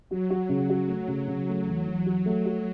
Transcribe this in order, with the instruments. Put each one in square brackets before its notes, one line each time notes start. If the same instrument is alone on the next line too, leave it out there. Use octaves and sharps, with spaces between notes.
[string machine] F#3 [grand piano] F#4
[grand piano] F#4
[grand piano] C#3 [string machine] F#3
[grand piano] F#4
A3
C#3
C#3
A3
E2
E2
F#4
A3
F#4